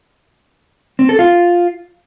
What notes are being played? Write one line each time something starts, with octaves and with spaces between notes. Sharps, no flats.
C4
A4
F4